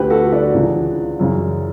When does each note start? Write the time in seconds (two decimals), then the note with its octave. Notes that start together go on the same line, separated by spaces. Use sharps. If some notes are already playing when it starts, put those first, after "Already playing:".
Already playing: D2 D3 G4 B4
0.10 F#4 A4
0.32 D4 F#4
0.54 C#2 C#3 E3
1.19 F#2 C#3 E3